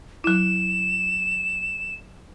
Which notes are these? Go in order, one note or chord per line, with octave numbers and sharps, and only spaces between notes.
F#3 E4 E7